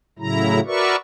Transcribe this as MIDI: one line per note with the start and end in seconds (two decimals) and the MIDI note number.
0.19 0.60 45
0.19 0.60 49
0.19 0.60 54
0.19 0.60 64
0.19 0.60 82
0.66 0.96 66
0.66 0.96 70
0.66 0.96 71
0.66 0.96 74
0.66 0.96 76
0.66 0.96 85